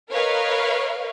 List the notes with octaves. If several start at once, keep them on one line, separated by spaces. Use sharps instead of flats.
A#4 B4 C#5 D#5 F5